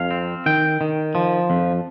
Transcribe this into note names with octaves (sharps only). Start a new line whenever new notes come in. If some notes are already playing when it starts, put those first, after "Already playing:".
Already playing: F2 F5
C4
D#3 G5
D#3
F3
F2